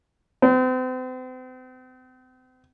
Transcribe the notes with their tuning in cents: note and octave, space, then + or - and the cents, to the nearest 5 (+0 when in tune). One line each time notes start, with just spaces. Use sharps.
C4 -40